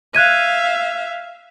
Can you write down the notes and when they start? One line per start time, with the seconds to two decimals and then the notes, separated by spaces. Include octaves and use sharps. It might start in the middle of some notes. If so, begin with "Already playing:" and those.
0.15 E5 F5 F#6 G#6 D#7